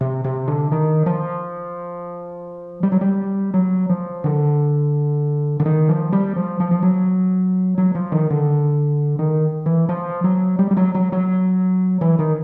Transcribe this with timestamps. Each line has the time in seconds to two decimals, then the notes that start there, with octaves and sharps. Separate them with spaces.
0.01 C3
0.24 C3
0.48 D3
0.72 D#3
1.06 F3
2.83 G3
2.92 F#3
3.01 G3
3.54 F#3
3.89 F3
4.24 D3
5.60 D3
5.66 D#3
5.89 F3
6.12 G3
6.36 F3
6.60 F3
6.71 F3
6.83 F#3
7.78 F#3
7.95 F3
8.12 D#3
8.30 D3
9.19 D#3
9.66 E3
9.89 F3
10.24 F#3
10.59 G3
10.71 G3
10.77 F#3
10.95 F#3
11.12 F#3
12.01 E3
12.19 D#3